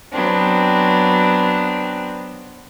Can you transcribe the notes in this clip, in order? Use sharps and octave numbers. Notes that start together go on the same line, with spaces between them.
F#3 B3 C4 D4